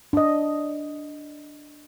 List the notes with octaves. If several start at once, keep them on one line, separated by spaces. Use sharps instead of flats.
D4 D#5